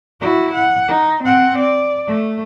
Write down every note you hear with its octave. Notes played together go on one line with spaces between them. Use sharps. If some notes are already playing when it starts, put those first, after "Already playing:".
E4 F#4
F#5
D#4
C4 F#5
D5
A3